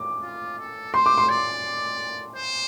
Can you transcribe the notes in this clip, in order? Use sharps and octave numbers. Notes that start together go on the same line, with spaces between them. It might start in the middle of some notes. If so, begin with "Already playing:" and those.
Already playing: D6
F4
A4
C5 C6
D6
C6
D5
C5